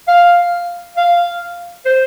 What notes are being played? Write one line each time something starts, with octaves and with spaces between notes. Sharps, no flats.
F5
F5
C5